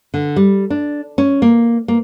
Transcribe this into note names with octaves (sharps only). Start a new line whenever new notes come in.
D3
G3
D4
C#4
A#3
A#3